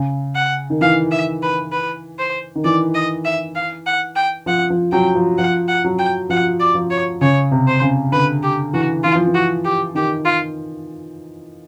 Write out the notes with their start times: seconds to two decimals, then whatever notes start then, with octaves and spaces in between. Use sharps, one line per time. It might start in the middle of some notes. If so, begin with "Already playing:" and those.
Already playing: C#3
0.35 F#5
0.70 D#3
0.81 E3 F5
1.11 E5
1.43 B4
1.72 B4
2.19 C5
2.55 D#3
2.64 E3 D5
2.95 D#5
3.25 E5
3.55 F5
3.86 F#5
4.16 G5
4.46 F3 F#5
4.70 F3
4.92 F#3 G5
5.15 F3
5.38 F3 F#5
5.68 F#5
5.85 F#3
5.99 G5
6.30 F3 F#5
6.60 D5
6.75 F3
6.91 C#5
7.21 C#3 C#5
7.51 C3
7.67 C5
7.82 C#3
8.12 D3 B4
8.43 G4
8.73 E3 F#4
9.03 E3 F4
9.16 F3
9.27 E3
9.35 F#4
9.65 G4
9.95 D#3 G4
10.25 F4